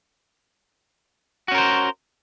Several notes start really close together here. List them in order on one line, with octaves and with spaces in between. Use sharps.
F#4 C#4 A#4 C5